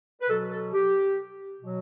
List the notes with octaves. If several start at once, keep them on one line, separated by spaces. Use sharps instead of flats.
B4
B2 F#3 A4
A4
G4
B2 F#3